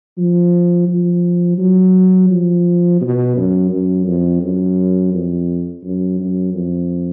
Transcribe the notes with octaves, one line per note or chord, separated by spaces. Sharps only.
F3
F3
F#3
F3
B2
F#2
F#2
F2
F#2
F2
F#2
F#2
F2